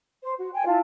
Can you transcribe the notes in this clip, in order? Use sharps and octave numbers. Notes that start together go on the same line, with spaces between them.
C5
F#4
G5 G#5
E4 F4 A5